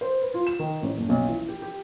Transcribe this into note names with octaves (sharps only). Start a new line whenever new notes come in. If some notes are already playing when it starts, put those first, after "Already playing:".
C5
B4
F4
E7
D#3
A1
F#1
B1
E3
G4
G4